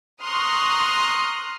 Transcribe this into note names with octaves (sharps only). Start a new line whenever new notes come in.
A#5 C6 C#6 D#6 F6 F#6